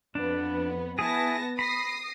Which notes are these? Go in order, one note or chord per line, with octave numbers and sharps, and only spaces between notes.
F2 B3 D4
B3 E4 G#4 A5 A#6
B5 D#6 A#6 C7